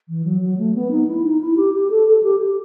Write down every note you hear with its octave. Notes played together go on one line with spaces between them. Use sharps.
E3
F#3
F#3
A3
B3
D#4
E4
D#4
E4
G4
G4
A4
A4
G4
G4